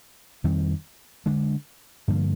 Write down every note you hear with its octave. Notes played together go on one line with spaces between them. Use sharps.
F2 D#3 G3 C4
D3 G#3 D4
G2 D3 F3 A#3